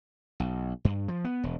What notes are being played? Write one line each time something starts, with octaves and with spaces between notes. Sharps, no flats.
B1
G2
F3
B3
E1